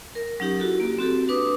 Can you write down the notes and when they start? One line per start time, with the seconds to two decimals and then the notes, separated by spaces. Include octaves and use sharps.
0.15 A#4
0.40 F#3 C#4 D#4 G4
0.59 E4 F#4 G4 A4
0.80 A#3
0.99 C4 F#4 G4 A4
1.29 D4 B4 D6 D#6